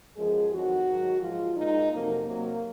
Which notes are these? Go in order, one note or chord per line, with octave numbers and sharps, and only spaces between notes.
F#2 F3 G#3 G#4
F2 D#3 F#3 F#4
G#2 D#3 F#3
G#2 F3 G#3 F4
A#2 G#3 D#4
F2 C3 F#3 A#3
C3 F#3 A#3